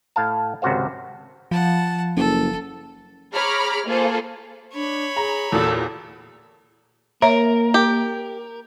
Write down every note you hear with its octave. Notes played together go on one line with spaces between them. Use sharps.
A2 F5 A5
G#1 C#2 C3 F#4 C5 F5
F3 F#5 A5
F#1 A4
G#4 C#5 A#5 B5 D6 F6
A#3 F4 G#4 A4 C5
D4 C#5 B5
G#4 A#5
E2 A#2 F#4 A4
A#3 A#4 C#5 E5 A#5
G4